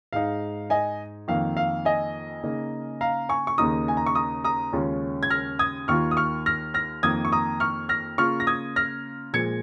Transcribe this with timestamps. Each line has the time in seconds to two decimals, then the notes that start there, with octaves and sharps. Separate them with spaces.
0.13 G#2 G#3 D#4 F5
0.70 D#5 G#5
1.28 F2 D#3 A#3 F5
1.57 F5
1.85 D#5 G#5
2.43 C#3 A#3 D#4
3.01 F5 A#5
3.29 G#5 C#6
3.47 C#6
3.58 D#2 C#3 A#3 D#4 A#5 D#6
3.88 G#5
3.97 A#5
4.06 C#6
4.15 A#5 D#6
4.44 A#5 D#6
4.73 D#2 C#3 G#3 C#4 F4
5.23 G#6
5.30 F6 A#6
5.59 D#6 G#6
5.88 D#2 D#3 A#3 F4 C#6 F6
6.11 D#6
6.17 C#6 F6
6.46 F6 A#6
6.74 F6 A#6
7.03 F2 D#3 A#3 D#6 G#6
7.25 C#6
7.32 A#5 D#6
7.60 C#6 F6
7.89 F6 A#6
8.18 C#3 A#3 F4 C#6 F6
8.40 A#6
8.47 D#6 G#6
8.76 F6 A#6
9.33 A#2 F3 G#3 G#6 C#7